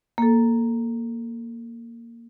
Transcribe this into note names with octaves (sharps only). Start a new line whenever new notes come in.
A#3 A4